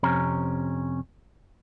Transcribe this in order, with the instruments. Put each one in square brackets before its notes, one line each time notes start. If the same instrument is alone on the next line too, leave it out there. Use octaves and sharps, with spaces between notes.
[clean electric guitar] F2 C3 C#4 A#5